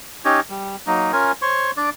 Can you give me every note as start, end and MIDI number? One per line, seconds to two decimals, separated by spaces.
0.25 0.40 61
0.25 0.40 63
0.25 0.40 67
0.25 0.40 73
0.50 0.76 55
0.87 1.12 54
0.87 1.12 58
0.87 1.12 63
1.13 1.32 61
1.13 1.32 65
1.13 1.32 70
1.13 1.32 80
1.42 1.71 72
1.42 1.71 73
1.42 1.71 85
1.77 1.90 62
1.77 1.90 74